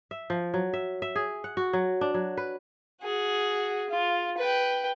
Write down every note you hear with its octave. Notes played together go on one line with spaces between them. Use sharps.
E5
F3
F#3
E5
E5
G#4
F#5
F#4
F#3
D4
F#3
B4
F#4 G#4
F4
B4 G5